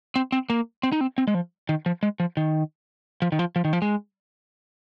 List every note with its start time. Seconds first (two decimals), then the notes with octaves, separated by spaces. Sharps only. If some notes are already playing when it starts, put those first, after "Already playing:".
0.16 C4
0.32 C4
0.50 A#3
0.83 C4
0.92 D#4
1.01 C4
1.18 C4
1.27 G#3
1.34 F3
1.69 D#3
1.86 F3
2.03 G#3
2.20 F3
2.37 D#3
3.22 F3
3.32 D#3
3.39 F3
3.56 F3
3.65 D#3
3.73 F3
3.82 G#3